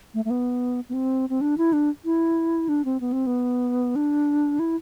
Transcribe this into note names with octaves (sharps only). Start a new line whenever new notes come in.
A3
A3
B3
B3
C4
C4
D4
E4
D4
E4
D4
C4
B3
C4
B3
D4
E4